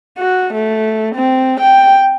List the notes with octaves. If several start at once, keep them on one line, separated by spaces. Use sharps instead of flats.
F#4
A3
C4
G5